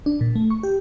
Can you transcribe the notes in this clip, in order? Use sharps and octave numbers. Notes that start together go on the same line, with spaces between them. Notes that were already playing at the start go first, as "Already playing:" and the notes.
D4
A#2
A3
C#6
G4